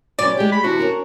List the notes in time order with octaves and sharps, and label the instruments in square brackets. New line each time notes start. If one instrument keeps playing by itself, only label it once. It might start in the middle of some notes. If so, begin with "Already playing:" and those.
[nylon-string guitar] B2 F#3 C#4 [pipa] D5
[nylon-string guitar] G3 G#3 [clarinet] G4
[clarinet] B5
[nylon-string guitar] E2 C3 D4 [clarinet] F#4
[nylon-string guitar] C#4 D4 A#4